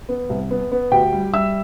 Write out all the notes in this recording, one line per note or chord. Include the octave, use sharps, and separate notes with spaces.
B3
C2
B3
B3
D2 G4 G5
G3
G3 E5 E6